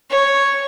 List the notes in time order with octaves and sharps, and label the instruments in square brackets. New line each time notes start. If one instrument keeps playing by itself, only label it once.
[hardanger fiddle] C#5